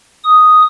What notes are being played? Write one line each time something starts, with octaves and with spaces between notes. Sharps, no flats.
D#6